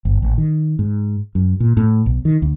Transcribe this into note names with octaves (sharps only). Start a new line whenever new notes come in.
G1
A1
D#3
G#2
F#2
A#2
A2
B1
D#3
D2